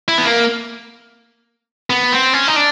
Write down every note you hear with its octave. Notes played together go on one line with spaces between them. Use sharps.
E4
B3
A#3
B3
C4
C#4
D#4
D4